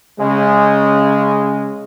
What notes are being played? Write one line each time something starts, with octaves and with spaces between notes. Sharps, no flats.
C#3 G#3